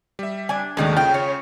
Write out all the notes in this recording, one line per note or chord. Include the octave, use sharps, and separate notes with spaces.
G3 E5
D4 G#5
D#2 A2 D#3 F#3 G#3 D4
C#3 C#4 F4 G5
C#5